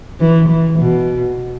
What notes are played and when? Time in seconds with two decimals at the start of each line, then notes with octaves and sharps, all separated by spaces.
0.20 E3
0.48 E3
0.79 B2